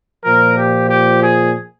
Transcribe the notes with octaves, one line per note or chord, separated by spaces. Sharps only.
A#2 F3 A#4
G4
G4
G#4